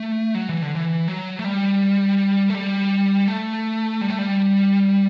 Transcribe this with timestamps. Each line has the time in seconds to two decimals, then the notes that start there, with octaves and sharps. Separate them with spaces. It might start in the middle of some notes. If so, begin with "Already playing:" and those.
Already playing: A3
0.35 F#3
0.49 E3
0.62 D3
0.76 E3
1.08 F#3
1.39 A3
1.44 G3
2.50 A3
2.54 G3
3.28 A3
4.01 G3
4.10 A3
4.18 G3